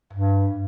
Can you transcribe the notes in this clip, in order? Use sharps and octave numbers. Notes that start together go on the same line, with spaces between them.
G2